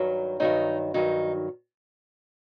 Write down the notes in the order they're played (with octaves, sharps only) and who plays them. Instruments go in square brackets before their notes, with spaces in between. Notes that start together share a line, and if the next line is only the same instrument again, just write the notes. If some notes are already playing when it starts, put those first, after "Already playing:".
Already playing: [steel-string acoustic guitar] G2 D#3 F#3
G2 D#3 F#3 D#4
G2 D#3 F#3 D#4